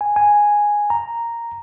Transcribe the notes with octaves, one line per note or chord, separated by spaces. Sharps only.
G#5
G#5
A#5